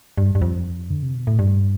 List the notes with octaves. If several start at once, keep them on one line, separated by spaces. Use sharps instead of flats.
G2
G2
F2
D3
C3
B2
A2
G2